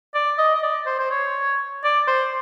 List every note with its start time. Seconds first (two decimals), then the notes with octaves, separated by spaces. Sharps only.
0.14 D5
0.38 D#5
0.55 D#5
0.63 D5
0.86 C5
0.99 C5
1.11 C#5
1.84 D5
2.07 C5